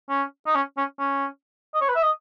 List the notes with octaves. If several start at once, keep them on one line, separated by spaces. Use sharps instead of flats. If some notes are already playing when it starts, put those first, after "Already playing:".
C#4
D#4
C#4
C#4
C#4
D#5
C#5
B4
E5
D#5